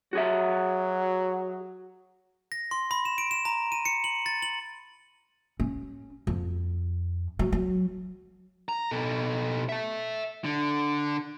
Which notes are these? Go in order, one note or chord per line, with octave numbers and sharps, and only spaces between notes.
F#3 F#4 G#4 E5
A#6
C6
B5
E7
D7
E7
A#5
D#7
C#7
F#7
A6
F#7
C#4
F2
F#3
F#3
A#5
B2 A4
E5 A5
D3